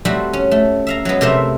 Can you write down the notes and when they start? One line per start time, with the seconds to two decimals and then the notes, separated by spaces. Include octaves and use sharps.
0.05 G3 A3 C4 F#4
0.33 C#4
0.51 A3
0.87 E5 F5 A#5
1.05 F#3 G#3 B3
1.21 C3 A3 A#4 C5 E5 F5